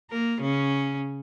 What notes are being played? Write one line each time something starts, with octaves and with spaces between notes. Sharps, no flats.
A#3 A#4
C#3 C#4